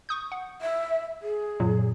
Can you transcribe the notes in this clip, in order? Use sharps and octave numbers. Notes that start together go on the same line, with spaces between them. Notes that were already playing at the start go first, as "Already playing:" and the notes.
C#6 D#6 G6
F#5
E5
G#4
F#2 A#2 F#3